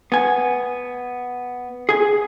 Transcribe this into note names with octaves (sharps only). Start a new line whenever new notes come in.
B3 G#5
G#4 G#5